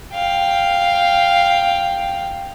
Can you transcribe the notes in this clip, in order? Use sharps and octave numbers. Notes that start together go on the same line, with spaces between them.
F5 G5